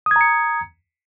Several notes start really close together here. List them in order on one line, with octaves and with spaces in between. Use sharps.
D#6 G#6 A#5 C#7